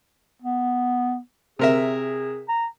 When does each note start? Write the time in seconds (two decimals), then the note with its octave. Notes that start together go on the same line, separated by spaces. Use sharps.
0.42 B3
1.59 C3 G#4 A#4 E5
2.48 A#5